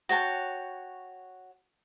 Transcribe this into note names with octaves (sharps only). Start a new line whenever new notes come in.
F#4 C#5 G5 A5